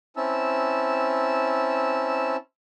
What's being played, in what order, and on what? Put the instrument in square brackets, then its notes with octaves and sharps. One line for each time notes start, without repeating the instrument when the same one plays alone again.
[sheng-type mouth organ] C4 C#4 E4 A5 E6